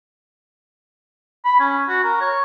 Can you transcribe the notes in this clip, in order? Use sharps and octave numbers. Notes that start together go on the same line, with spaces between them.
B5
C#4
F#4
A#4
C#5